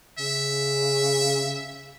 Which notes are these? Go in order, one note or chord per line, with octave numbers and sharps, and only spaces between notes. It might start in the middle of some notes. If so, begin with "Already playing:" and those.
C#3 E5